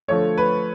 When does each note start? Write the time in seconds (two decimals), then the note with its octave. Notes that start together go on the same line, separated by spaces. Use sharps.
0.08 D3 F3 A3 C#5
0.37 B4